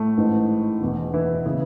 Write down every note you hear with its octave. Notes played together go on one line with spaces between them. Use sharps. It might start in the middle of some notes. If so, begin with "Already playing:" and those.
Already playing: A2 A3
A1 G#2 E3
E1 E2 B2
E3 E4
C#3 E3